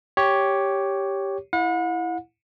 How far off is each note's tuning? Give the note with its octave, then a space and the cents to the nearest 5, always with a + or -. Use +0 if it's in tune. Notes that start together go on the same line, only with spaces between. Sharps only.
G4 +0 C#5 +5
E4 +0 F#5 -40